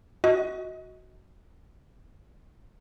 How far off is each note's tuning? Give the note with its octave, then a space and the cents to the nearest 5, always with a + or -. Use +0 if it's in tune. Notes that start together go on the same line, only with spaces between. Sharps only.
F#4 +0 D#5 +30